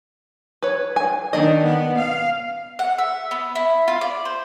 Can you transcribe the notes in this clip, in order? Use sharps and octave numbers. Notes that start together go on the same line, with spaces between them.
B4 C#5
G#5
D#3 A#3 D4 D#5
B3
F5
F#5
E5
B3
E4
F4
D5
C5